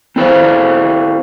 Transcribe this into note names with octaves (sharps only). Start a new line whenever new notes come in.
C4 E4 A4 C5 F5